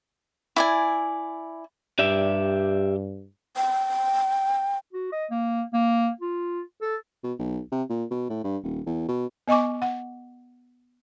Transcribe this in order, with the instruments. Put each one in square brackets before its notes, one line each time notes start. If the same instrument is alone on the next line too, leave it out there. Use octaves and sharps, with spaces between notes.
[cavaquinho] E4 D5 G#5
[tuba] G2 [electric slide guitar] G4 D5 E5
[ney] G5
[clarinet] F#4
D#5
A#3
A#3
F4
A4
[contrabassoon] B2
B1
C3
A#2
B2
A2
G2
D#1
E2
B2
[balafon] B3 D#5 G#5 C#6 D6
F#5